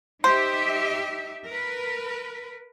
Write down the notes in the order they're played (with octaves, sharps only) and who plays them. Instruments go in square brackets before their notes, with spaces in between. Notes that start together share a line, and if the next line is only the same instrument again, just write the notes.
[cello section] D#4 G4 E5 [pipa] C5
[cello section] A#4 B4